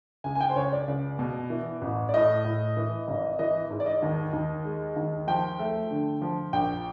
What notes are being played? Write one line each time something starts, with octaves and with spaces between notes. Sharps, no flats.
C#2 G#5
G#5
G5
C5
C#2 C#5
D5
C#2
B2
E3
A1
D5
A2 D#5
A2
E3
G#1
E3 D#5
G#2
D5
D#5
D#2
D#2
G#3
D#2
F3 G5
A3
D3
F3
A#1 G5